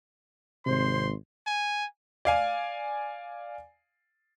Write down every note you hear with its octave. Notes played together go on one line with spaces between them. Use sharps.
G#1 C3 C5 C6
G#5
D5 F5 G#5